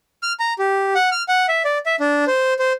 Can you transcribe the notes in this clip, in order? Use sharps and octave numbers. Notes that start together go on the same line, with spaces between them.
F6
A#5
G4
F#5
F6
F#5
E5
D5
E5
D4
C5
C5